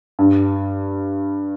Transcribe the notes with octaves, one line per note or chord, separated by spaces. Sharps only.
G2